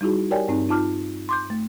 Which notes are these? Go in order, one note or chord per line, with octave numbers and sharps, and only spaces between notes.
G3 D#4 E4 F#4 G#4
G4 A#4 C#5 D5 G5 G#5
G2 C4 D#4
D#4 F4 A5 D6 F6
C6 D6 G6
A3